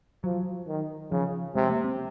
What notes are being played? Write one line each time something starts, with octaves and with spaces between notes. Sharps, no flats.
F3 F#3
D#3
C#3 F3
C3 G#3
A#3
C4